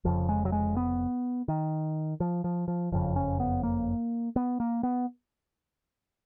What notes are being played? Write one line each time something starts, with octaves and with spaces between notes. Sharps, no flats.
F1 F2 C#3 F3
G#3
F#3
G#3
B3
D#3
F3
F3
F3
F#1 F2 C#3 F3
C#4
B3
A#3
B3
A#3
B3